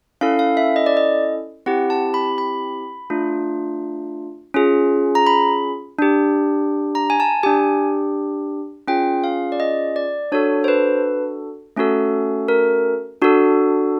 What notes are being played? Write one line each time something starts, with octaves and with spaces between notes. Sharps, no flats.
C#4 E4 A4 F5
F5
E5
D#5
D5
D#5
C4 E4 G4 F#5
A5
B5
B5
A3 D4 F4
C#4 F4 G#4
A#5
B5
D4 G4
A#5
G#5
A5
D4 G4 G#5
C#4 F4 G#4 G5
F5
D5
D#5
D5
D4 F#4 A4 C#5
C5
B4
A3 C#4 F#4 A4
A#4
D4 F#4 A4